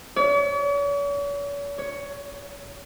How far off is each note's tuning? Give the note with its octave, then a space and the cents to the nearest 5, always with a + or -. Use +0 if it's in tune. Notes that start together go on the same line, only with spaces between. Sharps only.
C#5 +45
C#5 +10